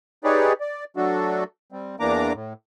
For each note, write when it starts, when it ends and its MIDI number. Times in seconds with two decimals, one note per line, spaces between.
0.24 0.53 63
0.24 0.53 67
0.24 0.53 68
0.24 0.53 71
0.24 0.53 73
0.24 0.53 74
0.60 0.84 74
0.97 1.44 54
0.97 1.44 57
0.97 1.44 62
0.97 1.44 66
0.97 1.44 69
1.72 1.96 55
1.72 1.96 60
2.00 2.33 40
2.00 2.33 52
2.00 2.33 58
2.00 2.33 62
2.00 2.33 82
2.00 2.33 86
2.34 2.53 45